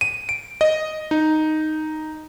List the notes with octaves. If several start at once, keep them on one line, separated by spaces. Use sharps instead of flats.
D#7
D7
D#5
D#4